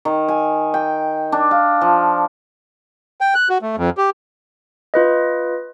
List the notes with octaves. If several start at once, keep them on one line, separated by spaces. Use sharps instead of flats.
D#3
G#5
G5
D4
F5
F3
G5
F#6
F#4
A3
F2
G4
F4 B4 D#5